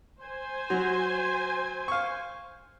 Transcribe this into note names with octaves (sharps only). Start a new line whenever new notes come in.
C5 G#5
F#3
F5 C#6